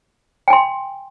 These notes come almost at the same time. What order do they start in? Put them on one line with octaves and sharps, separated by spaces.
G5 G#5 C6